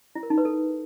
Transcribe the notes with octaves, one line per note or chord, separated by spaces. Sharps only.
E4
A#4
D#4
B4
A4